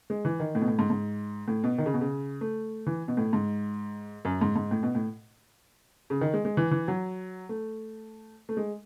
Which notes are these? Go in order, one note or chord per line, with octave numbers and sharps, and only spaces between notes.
G#3
E3
D#3
A2
B2
A2
G#2
G#2
A2
B2
D#3
C#3
B2
C#3
A3
E3
B2
A2
G#2
F#2
G#2
G#2
A2
B2
A2
C#3
D#3
G#3
G#3
E3
E3
F#3
A3
A3
G#3